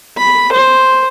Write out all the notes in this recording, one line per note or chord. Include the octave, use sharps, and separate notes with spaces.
B5
C5